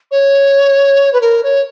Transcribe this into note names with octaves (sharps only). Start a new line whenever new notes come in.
C#5
B4
A#4
C#5